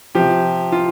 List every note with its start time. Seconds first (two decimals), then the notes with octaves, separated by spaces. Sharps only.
0.15 C3 F3 G4
0.72 F4